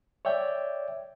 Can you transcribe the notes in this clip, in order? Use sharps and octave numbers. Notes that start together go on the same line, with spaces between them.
C#5 D5 E5 G5